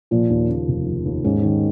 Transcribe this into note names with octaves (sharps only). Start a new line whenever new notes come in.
A#2 F3
D#2
C#3
F1
F3
D#2
G#2 C#4
D#3